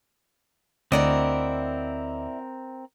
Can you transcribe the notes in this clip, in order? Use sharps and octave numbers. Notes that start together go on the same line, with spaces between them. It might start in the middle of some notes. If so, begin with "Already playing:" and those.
D2 C4 E4 A#4 D5 D#5 F#5 D6